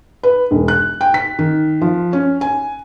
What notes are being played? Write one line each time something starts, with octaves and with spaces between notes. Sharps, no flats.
B4
E1
F#6
G5
B6
D#3
F3
C#4
G#5